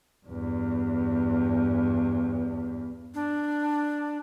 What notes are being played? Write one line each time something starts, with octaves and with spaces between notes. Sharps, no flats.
E2 G2
D4